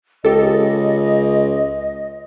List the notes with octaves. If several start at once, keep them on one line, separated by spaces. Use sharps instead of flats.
C#2 G4 A4 D#5